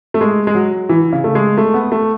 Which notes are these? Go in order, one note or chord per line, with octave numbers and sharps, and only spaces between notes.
A3
G#3
G#3
F#3
E3
C#3
A3
G#3
A3
B3
A3